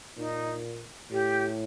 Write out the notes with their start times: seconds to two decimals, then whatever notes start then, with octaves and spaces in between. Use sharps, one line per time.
0.17 A#2 D#4
1.11 A2 G4